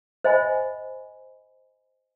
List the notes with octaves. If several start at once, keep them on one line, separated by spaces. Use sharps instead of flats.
C5 D#5 E5 G#5 B5